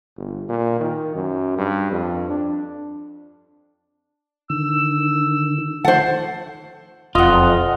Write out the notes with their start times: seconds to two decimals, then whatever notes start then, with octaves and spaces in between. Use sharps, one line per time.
0.17 G1
0.49 A#2
0.80 D#3
1.16 F#2
1.58 G2
1.92 F2
2.30 D4
4.50 D3 D#3 E6
5.85 D#3 F3 A3 C5 F#5 A5
7.15 E1 F2 F4 D#5 F#5